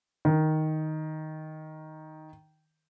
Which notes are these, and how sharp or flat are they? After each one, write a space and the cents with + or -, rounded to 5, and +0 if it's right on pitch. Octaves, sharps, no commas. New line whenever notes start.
D#3 +5